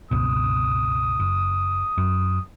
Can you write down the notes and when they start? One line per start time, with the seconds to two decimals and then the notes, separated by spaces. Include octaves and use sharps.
0.11 G1 C#2 B2 D#6
1.20 F#1
1.98 F#2